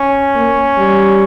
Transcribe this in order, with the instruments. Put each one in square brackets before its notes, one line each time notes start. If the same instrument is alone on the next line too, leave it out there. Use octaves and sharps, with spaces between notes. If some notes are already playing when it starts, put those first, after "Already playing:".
Already playing: [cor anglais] C#4
[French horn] A#3
G3